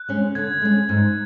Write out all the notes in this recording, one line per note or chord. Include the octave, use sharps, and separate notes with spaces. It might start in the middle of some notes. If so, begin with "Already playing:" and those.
Already playing: F#6
G#3 C#4
D3 G#6
G#3 C#4
G#2